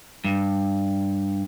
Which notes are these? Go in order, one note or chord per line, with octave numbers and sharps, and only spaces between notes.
G2